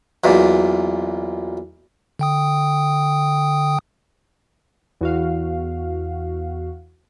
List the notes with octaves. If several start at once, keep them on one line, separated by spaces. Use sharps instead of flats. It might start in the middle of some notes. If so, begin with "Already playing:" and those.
B1 E2 A#2
D3 G5 D#6
E2 F#4 F5